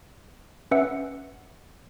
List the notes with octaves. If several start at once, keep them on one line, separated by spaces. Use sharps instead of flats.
C#4 B4 E5 F#5 E6 C#7